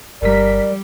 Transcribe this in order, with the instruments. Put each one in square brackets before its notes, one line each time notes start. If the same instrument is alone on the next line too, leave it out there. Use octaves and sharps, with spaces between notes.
[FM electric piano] G1 B6 [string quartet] G3 [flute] A#4 [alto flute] D5